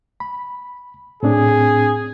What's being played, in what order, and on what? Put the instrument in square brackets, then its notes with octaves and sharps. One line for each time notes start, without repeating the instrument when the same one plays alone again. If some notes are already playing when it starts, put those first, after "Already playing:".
[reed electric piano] B5
[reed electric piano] A2 C4 D4 [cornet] G#4